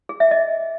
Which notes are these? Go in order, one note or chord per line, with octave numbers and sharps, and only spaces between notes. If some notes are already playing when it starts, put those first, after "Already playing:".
G#4
E5
D#5